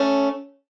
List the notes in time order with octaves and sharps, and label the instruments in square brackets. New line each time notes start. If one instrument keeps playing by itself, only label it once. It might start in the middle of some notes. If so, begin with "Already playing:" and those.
Already playing: [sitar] A3 C#4